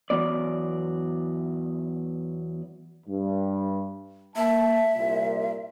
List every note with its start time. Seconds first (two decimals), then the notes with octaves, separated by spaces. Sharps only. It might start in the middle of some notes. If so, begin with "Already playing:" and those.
0.10 E2 F#3 B3 D5
3.07 G2
4.36 A#3 E5 A5
4.93 C2 A#2